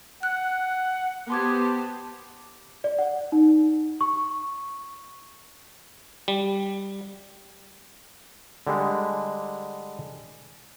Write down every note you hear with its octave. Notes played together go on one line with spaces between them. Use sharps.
F#5 F#6
B3 G4 C5 A5 C6 D6 G#6
D5
F#5
D#4
C#6
G3
D3 G3 G#3